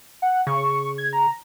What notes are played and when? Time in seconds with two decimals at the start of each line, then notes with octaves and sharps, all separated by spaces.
0.22 F#5
0.47 C#3 C#6
0.98 G#6
1.13 A#5